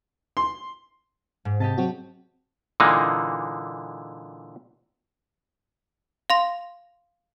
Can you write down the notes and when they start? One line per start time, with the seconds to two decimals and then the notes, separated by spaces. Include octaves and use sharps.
0.37 C6
1.45 G#2
1.60 C3 G4 D#5 A5
1.78 F#3 C4 F#4
2.80 A#2 D3 E3 G#3 A#3 D#4
6.30 F5 C6 A#6